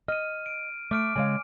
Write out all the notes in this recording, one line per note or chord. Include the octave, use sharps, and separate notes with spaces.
D#5 F6 D#7
D7
A3 D6 F6 D7
C#3 G#3 F5 G#5